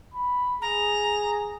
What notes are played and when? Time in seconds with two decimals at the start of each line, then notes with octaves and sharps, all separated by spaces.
0.14 B5
0.62 G#4 A#5